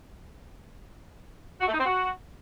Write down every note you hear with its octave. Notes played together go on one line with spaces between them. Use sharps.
F#4
A3
D#4
C4
F#4